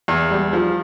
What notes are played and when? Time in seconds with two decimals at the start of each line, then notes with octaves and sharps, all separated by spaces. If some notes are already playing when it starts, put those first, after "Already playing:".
0.08 E2
0.31 G3
0.53 F3